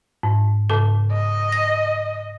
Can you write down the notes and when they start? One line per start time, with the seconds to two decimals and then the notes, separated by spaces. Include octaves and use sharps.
0.23 G#2
0.70 G#2 C#3 A4
1.13 D#5
1.52 A#6